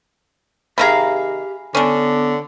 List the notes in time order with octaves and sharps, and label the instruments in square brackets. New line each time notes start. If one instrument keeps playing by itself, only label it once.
[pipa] C3 D#3 A#5 [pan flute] G4 [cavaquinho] G#4 F5 B5
[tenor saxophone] D3 [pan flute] B3 [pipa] C#4 D4